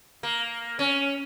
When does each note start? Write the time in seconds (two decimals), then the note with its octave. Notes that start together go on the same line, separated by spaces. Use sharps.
0.23 A#3
0.79 C#4